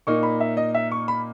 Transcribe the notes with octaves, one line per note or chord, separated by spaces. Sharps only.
A#2 A#3 D#4 C#6
B5
E5
D#5
E5
C#6
B5